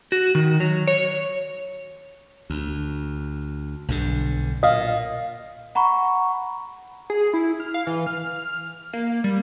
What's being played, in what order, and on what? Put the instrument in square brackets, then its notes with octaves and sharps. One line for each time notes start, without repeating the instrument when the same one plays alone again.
[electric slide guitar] F#4
D#3
F#3
C#5
[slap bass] D2
B1 G2 D3
[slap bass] A#2 [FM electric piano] D#5 F5
[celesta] F#5 A#5 B5 C#6
[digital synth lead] G#4
E4
F6
F5
E3
F6
A#3
G3